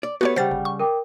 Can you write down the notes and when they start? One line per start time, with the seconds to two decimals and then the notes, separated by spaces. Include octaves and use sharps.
0.03 D5
0.21 A3 B3 F#4 G4 C#5
0.36 C#3 G3 C5 F#5 G5 A6
0.51 G1
0.65 C#6
0.80 A#4 G5 D6